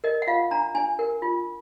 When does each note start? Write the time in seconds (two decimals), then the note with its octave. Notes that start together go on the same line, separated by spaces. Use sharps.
0.04 A#4 D#5
0.22 F#5
0.27 F4 F5
0.51 D4 A#5
0.75 D4 G#5
0.99 A#4
1.22 F4